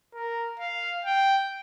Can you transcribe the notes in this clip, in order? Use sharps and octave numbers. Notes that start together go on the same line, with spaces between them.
A#4
F5
G5